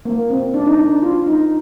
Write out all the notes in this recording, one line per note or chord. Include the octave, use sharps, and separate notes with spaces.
A#3
C4
D4
D#4
D4
F4
D#4